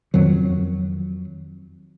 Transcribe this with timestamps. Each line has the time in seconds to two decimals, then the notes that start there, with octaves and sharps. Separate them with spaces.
0.14 F2 D#3 F#3